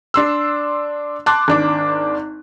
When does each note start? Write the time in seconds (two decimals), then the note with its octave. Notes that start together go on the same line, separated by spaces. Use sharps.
0.14 D4 C6 E6
1.26 A5 C6 D6 F#6
1.48 G#1 D4 D6